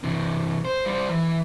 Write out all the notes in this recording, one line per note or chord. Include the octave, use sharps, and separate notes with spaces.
C3 E3
C5
G3 C5
E3